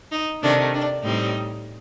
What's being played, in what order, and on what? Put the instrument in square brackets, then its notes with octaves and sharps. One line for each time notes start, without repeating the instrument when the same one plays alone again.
[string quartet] D#4
C3 D#3 A3 D4
D4
A2 G3 C4 D#4